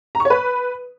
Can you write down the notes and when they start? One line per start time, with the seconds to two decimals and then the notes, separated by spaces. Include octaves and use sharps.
0.15 A#5
0.20 C#6
0.25 C#5
0.30 B4